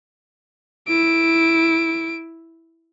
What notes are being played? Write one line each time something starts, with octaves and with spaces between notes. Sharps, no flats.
E4 D7